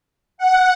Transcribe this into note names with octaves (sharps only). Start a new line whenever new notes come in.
F#5